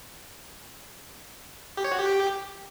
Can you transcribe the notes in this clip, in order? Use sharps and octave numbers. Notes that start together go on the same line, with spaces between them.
G4
C#5
F#4
G4